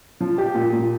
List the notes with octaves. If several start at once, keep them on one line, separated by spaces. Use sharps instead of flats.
F3
G4
A#2
A#2